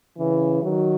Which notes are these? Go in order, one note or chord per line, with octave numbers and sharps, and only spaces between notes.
C#3 E3
D#3 F#3